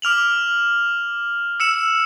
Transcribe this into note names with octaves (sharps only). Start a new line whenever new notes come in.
D6 F6 F7 F#7
E6 C#7 E7